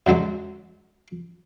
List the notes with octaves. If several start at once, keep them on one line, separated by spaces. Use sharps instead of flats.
F#2 D3 F#3 G#3